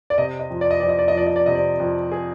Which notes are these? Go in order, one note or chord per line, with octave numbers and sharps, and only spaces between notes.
D5
C3 D#5
D#5
F2
D5
D#5
F2 D5
D#5
D5
D#5
F3 D5
D#5
D5
C3 D#5
D5
F2
G#4